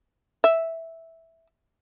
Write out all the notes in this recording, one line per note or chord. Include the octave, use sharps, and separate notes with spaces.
E5